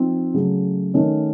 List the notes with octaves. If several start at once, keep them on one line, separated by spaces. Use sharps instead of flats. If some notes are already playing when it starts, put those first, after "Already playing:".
Already playing: F3 C4 D#4
C#3 F#3 A3
D#3 A3 C#4